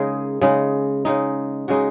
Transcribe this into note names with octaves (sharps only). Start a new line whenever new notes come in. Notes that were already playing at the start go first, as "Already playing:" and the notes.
Already playing: C#3 G#3 D#4 G#4 A#4
C#3 G#3 D#4
C#3 G#3 D#4
C#3 G#3 D#4 F#4